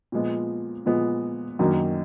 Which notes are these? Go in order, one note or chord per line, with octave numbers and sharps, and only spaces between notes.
A#2 F3 G#3 B3
A#2 F3 G#3 B3
F#2 D#3 F#3 A#3 D4